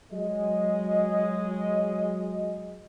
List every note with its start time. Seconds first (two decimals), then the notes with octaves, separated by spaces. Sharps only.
0.12 F#3 G#3 D#5